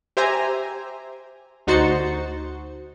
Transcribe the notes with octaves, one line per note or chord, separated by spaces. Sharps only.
G4 C5 E5 G#5 A#5
D2 D#4 F#4 C5 A6 C#7